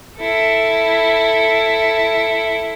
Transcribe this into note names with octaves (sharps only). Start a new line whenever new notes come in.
E4 A4